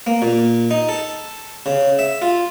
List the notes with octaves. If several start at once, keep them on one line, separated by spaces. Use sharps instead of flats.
A#3
A#2
D#4
A4
C#3
E5
F4